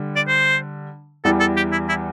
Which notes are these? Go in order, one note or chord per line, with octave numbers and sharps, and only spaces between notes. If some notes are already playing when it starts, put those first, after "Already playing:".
Already playing: D3 G3
D5
C5
E2 E3 G3 A4
A4
G4
E4
E4